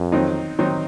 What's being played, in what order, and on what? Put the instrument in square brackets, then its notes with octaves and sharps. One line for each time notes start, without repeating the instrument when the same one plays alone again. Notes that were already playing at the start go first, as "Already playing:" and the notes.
Already playing: [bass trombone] F2
[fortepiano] D#3 F#3 C4 D#4
D#3 F#3 C4 D#4